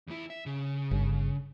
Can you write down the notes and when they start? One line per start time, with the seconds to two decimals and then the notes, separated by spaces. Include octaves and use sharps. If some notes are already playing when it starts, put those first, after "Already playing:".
0.07 E2 E4
0.30 E5
0.46 C#3
0.91 G1